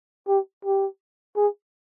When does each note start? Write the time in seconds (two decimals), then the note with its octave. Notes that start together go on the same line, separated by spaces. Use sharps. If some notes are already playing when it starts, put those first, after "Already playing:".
0.28 G4
0.65 G4
1.37 G#4